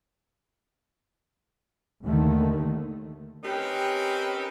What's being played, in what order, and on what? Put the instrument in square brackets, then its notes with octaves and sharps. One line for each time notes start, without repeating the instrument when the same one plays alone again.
[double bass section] D#2 D3 D#3 A3
[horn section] C4 C#4 D#4 G4 A#4 B4